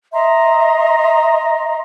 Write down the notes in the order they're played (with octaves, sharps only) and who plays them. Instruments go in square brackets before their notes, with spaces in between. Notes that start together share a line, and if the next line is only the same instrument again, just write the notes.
[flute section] D#5 E5 A#5 C6